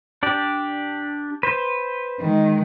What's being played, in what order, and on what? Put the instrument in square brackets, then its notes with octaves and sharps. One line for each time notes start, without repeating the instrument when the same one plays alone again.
[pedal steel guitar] D4 G4 D5
B4 C5
[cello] D#3 G#3